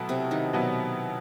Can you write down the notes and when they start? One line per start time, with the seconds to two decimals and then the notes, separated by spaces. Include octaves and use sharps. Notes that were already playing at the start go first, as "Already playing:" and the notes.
Already playing: B2 F#3 A3 B3 E4
0.09 C3 C4
0.31 D#3 D#4
0.53 B2 F#3 B3 E4